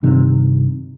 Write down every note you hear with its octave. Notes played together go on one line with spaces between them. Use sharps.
G2 C3 D#3